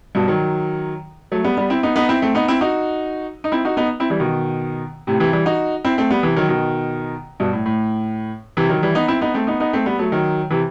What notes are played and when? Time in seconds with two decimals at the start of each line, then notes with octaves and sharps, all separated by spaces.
0.15 G2 B2
0.28 D#3 F#3
1.32 F#3 A3
1.44 G3 B3
1.57 G3 B3
1.70 C4 E4
1.83 B3 D#4
1.96 B3 D#4
2.09 C4 E4
2.22 A3 C4
2.35 B3 D#4
2.48 C4 E4
2.61 D#4 F#4
3.44 D#4
3.52 C4 E4
3.65 D#4 F#4
3.77 B3 D#4
4.00 C4 E4
4.10 E3 G3
4.20 B2 D#3
5.07 A2 C3
5.20 C3 E3
5.33 E3 G3
5.46 D#4 F#4
5.85 C4 E4
5.98 A3 C4
6.10 G3 B3
6.23 C3 E3
6.36 D#3 F#3
6.49 B2 D#3
7.40 G2 B2
7.53 A2
7.66 A2
8.57 C3 E3
8.69 D#3 F#3
8.82 E3 G3
8.95 B3 D#4
9.08 C4 E4
9.21 B3 D#4
9.34 A3 C4
9.47 B3 D#4
9.60 B3 D#4
9.73 A3 C4
9.86 G3 B3
9.99 F#3 A3
10.12 D#3 F#3
10.50 C3 E3